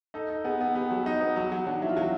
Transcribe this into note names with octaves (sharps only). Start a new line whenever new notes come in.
D#4 A4
D#4
B3 G#4
B3
B3 G4
F#3
D#4
B3
F#3
F#3
F#3 D4
D#4
F#3 E4
F4
F#3 F#4